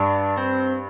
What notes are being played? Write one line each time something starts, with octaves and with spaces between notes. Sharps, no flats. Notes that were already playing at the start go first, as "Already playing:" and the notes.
Already playing: G2 D4
C4